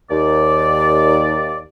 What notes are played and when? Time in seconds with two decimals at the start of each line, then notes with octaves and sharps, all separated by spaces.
0.10 D#2 D5